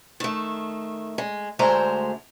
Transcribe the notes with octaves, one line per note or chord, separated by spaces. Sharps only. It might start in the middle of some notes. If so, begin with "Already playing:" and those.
D#3 A3
G#3
D2 G#3 A3 C5 A#5